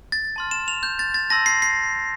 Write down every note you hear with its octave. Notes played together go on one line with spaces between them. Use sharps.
A6
A5 C6 F6
E7
F7
G6
A6
A6
A5 C6 E6 A#6
C7
C7